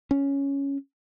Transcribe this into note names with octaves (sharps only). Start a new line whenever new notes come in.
C#4